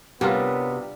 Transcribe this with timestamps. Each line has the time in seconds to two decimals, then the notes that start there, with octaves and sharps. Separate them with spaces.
0.21 C3 G3 B3 D4 F4 F#4 A#4 C#5